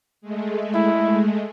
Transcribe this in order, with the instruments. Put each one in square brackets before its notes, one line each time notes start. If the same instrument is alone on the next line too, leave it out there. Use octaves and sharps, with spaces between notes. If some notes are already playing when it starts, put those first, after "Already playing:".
[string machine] G#3 A3
[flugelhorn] E4